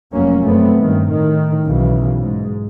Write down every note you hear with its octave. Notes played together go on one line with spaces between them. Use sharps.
F1 F#3 A#3 C#4
F#2 A3 B3 C4
G2 D#3
A2 D#3
B1 C#3 E3
G#2